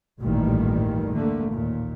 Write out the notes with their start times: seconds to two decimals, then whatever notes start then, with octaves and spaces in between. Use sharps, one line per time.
0.20 A1 D2 G2 A#2 D#3 G3
1.13 D3 A3 A#3
1.52 D#2 A#2